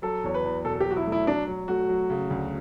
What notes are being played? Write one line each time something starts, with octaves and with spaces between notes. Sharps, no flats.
F#3 A4
E2 C#5
B4
E2
B2 A4
A4
G4
F#3 F#4
E4
A3
E4
F#3 D4
F#3
A3 F#4
F#3
C#3
D2